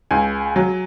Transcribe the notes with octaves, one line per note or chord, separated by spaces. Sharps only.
C#2 G#5
F#3